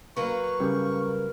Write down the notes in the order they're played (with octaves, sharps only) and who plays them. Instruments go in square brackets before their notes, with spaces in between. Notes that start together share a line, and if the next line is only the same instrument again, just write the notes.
[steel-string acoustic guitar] F#3 A#3 B4 [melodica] C#6
[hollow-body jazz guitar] C#3 G3 [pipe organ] A#4